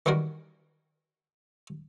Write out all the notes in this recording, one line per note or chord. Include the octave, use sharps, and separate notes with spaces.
D#3 E3 G3 F#4 A#4